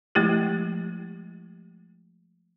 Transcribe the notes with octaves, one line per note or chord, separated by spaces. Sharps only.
F3 G#3 A3 E4 G4